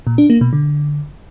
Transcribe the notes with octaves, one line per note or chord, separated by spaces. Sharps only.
A#2
D4
A#3
B2
D3